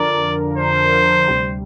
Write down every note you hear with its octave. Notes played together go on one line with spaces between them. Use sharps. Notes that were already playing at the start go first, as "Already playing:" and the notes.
Already playing: F2 D3 F3 D4 A#4 D5
C5
D2 C3 G3